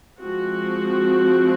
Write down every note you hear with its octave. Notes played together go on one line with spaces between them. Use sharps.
F3 G#3 C4 F#4